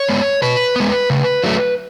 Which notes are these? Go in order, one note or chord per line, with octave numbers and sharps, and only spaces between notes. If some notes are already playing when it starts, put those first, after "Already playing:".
Already playing: C#5
G#3 B3
B2 B4
G#3 B3
C#3
F#3 A3